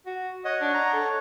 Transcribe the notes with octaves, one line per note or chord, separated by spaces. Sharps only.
F#4
C#5 D#5 F#5
D4
A#5
A4